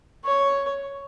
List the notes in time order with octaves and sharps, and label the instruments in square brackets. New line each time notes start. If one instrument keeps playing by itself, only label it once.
[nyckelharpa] C#5